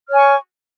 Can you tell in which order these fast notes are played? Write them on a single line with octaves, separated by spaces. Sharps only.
F6 C#5 G#5 C#6